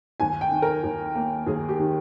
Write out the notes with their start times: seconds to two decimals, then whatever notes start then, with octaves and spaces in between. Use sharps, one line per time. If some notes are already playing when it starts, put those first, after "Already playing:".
0.20 D#2 G#5
0.41 G5
0.51 D#3
0.62 A#4
0.84 D#2
1.15 A#3
1.47 D#2 G#4
1.69 G4
1.79 D#3